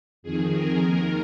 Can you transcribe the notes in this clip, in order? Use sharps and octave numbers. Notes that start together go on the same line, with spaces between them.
F2 D#3 G#4
A#4
D#2 D#3 A#4